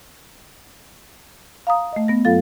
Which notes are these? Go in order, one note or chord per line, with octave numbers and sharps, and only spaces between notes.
F5 A#5 D#6
A3 D#5
B3 A#6
G2 F#3 F4 A4 F5 A6